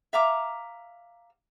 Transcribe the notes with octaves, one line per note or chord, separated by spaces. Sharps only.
E5 F5 A#5 D6